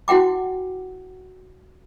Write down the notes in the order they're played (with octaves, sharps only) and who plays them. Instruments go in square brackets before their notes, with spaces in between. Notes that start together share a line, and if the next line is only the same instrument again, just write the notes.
[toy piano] E4 F#4 F#5 G5 D6